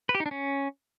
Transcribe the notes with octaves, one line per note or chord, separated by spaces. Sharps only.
B4
G4
D#4
D4
C#4